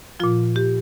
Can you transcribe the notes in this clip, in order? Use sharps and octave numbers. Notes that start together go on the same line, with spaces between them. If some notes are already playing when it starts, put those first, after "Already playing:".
A#2 F3 F4
G4